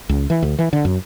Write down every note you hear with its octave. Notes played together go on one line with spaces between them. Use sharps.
C#2
E3
D2
E3
D3
F#2